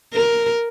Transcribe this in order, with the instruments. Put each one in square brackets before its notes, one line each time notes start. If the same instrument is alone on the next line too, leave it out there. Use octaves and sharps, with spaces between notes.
[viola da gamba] A#4